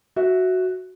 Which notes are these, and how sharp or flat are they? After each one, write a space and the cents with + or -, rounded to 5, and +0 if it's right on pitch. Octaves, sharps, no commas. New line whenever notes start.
F#4 +0 E5 -5